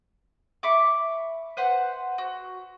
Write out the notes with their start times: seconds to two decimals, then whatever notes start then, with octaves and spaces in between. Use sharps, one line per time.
0.63 E5 B5 C#6 D6
1.57 B4 C5 F#5
2.18 F#4